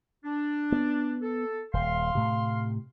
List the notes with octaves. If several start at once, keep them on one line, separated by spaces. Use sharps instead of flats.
D4
B3
A4
D#1 F5 C6
A2 C3